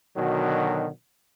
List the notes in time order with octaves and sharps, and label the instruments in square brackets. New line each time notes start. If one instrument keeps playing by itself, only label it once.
[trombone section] B2 D3 D#3 F#3